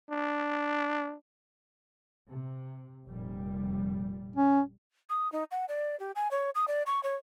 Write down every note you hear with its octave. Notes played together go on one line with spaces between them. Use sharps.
D4
C3
F1 A#2 G3
C#4
D#6
D#4
F#5
D5
G4
G#5
C#5
D#6
D5
C#6
C#5